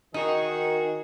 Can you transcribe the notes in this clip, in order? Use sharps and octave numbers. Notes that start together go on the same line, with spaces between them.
D#3 D#4 F#4 G#4